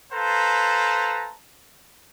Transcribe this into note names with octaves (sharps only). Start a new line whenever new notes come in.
A4 B4 C5 F5 A5 A#5